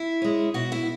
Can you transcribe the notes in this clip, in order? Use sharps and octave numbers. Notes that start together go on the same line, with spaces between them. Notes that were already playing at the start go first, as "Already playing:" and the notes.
Already playing: E4
G#3 C#4
B2 F#4
E4